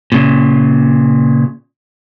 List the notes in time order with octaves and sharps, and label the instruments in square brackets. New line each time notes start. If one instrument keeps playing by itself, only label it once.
[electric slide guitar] A#2 C#3